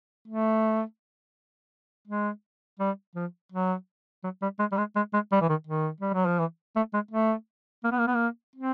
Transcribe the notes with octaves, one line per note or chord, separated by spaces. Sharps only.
A3
G#3
G3
F3
F#3
F#3
G3
G#3
G3
G#3
G#3
G#3
G3
E3
D#3
D#3
G3
F#3
F3
E3
A3
G#3
A3
A#3
B3
A#3
B3
A#3
C4